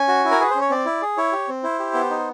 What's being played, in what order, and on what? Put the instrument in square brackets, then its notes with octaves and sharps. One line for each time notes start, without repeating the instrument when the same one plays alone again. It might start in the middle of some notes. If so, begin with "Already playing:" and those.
Already playing: [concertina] C#4 G#5
F#4
E4
A#4
G#4 B4
C#4 C5
C#5
C4 D5
E4
G#4
E4 C#5
G4
C4
E4 C5
G4
B3
D#4